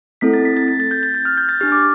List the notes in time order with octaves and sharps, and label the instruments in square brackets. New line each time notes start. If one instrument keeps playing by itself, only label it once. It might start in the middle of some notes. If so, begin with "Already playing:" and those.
[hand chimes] A3 C4 E4 A4 B6
A6
B6
A6
A6
A6
G6
A6
G6
F6
G6
A6
D4 G4 F6
D6